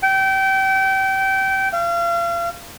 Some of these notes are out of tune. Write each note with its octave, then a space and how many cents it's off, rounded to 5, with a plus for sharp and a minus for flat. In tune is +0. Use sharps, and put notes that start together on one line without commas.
G5 -25
F5 -35